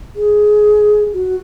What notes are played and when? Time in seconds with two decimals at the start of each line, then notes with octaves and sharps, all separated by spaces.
0.16 G#4
1.13 F#4